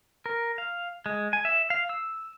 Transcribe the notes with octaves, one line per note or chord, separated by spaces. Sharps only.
A#4
F5
G#3
G#5
E5
F5
E6